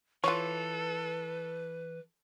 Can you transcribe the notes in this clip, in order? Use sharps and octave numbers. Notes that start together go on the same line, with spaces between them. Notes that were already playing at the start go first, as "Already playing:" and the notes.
E3 F4 A4 B4 C#5